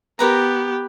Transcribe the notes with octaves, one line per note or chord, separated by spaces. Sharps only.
B3 G4 A#4 B4 A#5